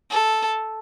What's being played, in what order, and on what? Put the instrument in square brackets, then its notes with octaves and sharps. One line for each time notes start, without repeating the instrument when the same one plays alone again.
[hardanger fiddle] A4